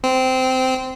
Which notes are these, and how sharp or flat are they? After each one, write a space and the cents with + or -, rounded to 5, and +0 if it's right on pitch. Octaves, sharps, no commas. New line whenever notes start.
C4 -15